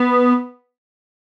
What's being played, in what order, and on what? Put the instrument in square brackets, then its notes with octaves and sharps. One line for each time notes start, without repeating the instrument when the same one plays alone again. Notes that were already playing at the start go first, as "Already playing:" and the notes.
Already playing: [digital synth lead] B3